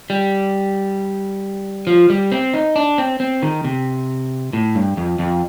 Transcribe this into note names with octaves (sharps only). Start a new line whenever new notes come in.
G3
F3
G3
C4
D#4
D4
C4
C4
D#3
C3
A2
G2
F2
F2